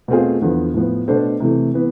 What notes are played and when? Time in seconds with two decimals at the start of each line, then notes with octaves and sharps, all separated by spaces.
0.08 B2 A3 C4 F4 G#4
0.41 E2 D3 F3 B3
0.74 A2 F3 B3
1.08 B2 A3 D4 A4 C5
1.40 C3 E3 A3
1.74 E3 B3